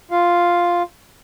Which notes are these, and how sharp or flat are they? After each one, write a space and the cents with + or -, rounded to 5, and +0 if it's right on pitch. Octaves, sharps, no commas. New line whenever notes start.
F4 +0 F5 +0